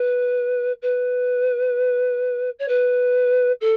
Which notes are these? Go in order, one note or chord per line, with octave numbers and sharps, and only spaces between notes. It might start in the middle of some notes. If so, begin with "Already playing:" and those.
Already playing: B4
B4
C#5
B4
A4